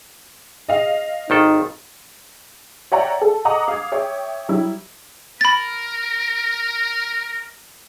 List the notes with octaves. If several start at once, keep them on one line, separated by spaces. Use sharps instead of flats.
D#5 F5
G#1 D#3 D#4 A4
C#5 D5 E5 F#5 G5 A#5
A4
D#5 F#5 A#5 D6 D#6
F5 G#6
C#5 E5 G5
F#3 G3 E4
A#4 B5 A6